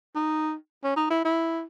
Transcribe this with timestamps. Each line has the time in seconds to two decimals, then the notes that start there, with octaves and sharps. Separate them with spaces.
0.15 D#4
0.84 C#4
0.97 D#4
1.10 E4
1.25 E4